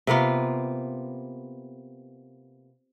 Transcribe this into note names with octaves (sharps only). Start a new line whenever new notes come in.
C3 A#3 B3 F4